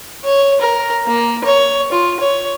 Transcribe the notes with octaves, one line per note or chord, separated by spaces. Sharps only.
C#5
A#4
A#3
C#5
F4
C#5